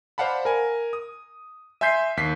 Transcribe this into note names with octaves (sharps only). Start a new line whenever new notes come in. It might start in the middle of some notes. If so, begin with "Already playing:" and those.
C5 D5 F5 F#5 A5 B5
A#4 G#5
D#6
E5 G#5 C6 G6 B6 C7
D#2 B6 C7